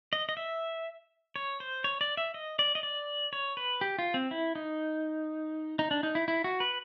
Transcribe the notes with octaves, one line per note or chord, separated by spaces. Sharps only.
D#5
D#5
E5
C#5
C5
C#5
D5
E5
D#5
D5
D#5
D5
C#5
B4
G4
F4
C4
E4
D#4
D#4
D4
D#4
E4
E4
F#4
B4